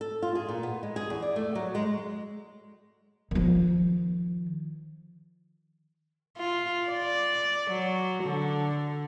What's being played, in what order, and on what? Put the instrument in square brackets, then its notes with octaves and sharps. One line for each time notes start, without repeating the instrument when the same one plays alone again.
[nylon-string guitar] A4
F4
G#4
A#2
B3
G#3
G#4
E2
D5
A3
F#3
G#3
[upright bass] D#3 F3
[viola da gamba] F4
D5
F#3
D3